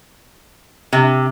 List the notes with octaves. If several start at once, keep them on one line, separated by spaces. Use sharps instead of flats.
C3